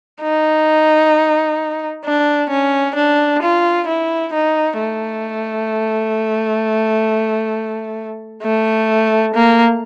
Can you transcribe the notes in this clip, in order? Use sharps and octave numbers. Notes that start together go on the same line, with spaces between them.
D#4
D4
C#4
D4
F4
E4
D#4
A3
A3
A#3